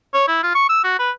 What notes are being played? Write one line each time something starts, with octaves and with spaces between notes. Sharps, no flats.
C#5
E4
F4
C#6
E6
F#4
B4